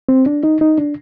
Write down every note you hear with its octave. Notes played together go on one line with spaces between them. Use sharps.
C4
D4
D#4
D#4
D4